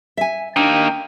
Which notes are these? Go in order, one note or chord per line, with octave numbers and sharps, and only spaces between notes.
E5 G#5
A#3 D4 D#4 G5